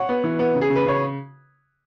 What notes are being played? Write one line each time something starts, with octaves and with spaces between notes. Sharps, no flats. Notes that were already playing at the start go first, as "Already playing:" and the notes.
Already playing: C#5 F#5
B3
E3
B3
C#3
G#4
C#3
B4
C#3 C#5